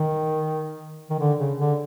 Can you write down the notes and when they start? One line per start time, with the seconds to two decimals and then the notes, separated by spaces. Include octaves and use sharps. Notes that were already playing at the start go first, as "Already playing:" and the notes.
Already playing: D#3
1.10 D#3
1.19 D3
1.39 C#3
1.59 D3